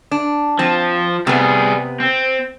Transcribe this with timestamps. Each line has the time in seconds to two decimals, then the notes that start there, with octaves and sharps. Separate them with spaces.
0.11 D4
0.59 F3 C4
1.27 C3 G3 B3 G#4
2.00 C4